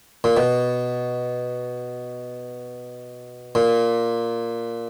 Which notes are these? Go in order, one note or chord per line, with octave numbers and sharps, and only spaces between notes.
A#2
B2
A#2